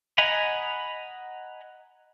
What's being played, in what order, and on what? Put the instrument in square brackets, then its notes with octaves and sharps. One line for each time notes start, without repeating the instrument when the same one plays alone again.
[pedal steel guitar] D#5 F#5 G#5 A#5 B5